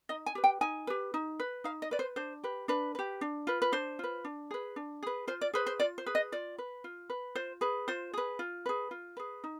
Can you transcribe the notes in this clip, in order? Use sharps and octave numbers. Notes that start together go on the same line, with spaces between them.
D#4 D#5
G#5
G4 B4
G5
D#4 G#5
G4 B4
D#4
B4
D#4 F5
D#5
B4 D5
C5
D4 C5
G4 B4
D4 B4
G4 B4
D4
F4 B4
B4
D4 C5
F4 B4
D4
G#4 B4
D4
G#4 B4
F4 C5
D5
G#4 B4 C5
C5
F4 D5
C5
G#4 B4
D#5
F4 D5
B4
F4
B4
F4 C5
G#4 B4
F4 C5
G#4 B4
F4
G#4 B4
F4
G#4 B4
D#4